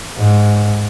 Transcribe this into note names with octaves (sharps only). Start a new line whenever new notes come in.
G#2